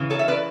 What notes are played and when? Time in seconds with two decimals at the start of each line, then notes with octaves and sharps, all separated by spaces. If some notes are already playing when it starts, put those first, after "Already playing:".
Already playing: C#3 E3
0.10 A4 C#5
0.19 E5
0.28 B4 D5